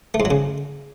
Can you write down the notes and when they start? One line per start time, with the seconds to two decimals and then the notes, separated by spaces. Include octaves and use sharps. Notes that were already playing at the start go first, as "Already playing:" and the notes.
0.14 A3
0.20 G#2
0.25 F#3
0.31 C#3